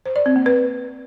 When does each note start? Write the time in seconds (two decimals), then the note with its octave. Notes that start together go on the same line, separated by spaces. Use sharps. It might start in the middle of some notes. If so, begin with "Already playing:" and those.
0.06 C5
0.16 D5
0.26 C4
0.36 A#3
0.46 B4